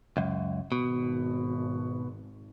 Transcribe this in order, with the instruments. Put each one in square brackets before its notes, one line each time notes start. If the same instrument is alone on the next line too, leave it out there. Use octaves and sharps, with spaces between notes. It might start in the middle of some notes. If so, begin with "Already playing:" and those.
[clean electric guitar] C#2 F#2
[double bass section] G#1 [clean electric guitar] B2